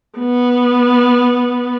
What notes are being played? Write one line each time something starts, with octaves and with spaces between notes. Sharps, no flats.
B3